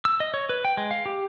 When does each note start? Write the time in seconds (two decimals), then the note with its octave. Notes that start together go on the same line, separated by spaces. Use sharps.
0.05 E6
0.20 D#5
0.34 C#5
0.49 B4
0.65 G5
0.77 G#3
0.91 F5
1.06 G4